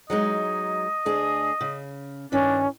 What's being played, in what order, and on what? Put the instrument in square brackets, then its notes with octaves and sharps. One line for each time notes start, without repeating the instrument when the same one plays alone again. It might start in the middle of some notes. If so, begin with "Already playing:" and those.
[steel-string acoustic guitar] F#3 G#3 D#4 [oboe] D#5
[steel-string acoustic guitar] D2 D4 G#4
C#3
[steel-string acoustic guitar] G2 D#3 [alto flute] C#4 [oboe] D4